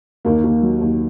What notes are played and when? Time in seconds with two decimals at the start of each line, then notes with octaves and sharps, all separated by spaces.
0.25 D#2 A#3
0.44 D#2
0.62 F#3
0.81 D#2